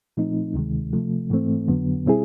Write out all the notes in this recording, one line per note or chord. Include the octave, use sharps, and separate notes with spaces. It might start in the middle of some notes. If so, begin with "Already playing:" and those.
A#2 F3 A3 C4 D#4
D2 C3 D#3 G#3
C3 F3 A3
G#2 E3 A3 C4
F2 D3 F#3 B3
B2 G3 C4 E4 G#4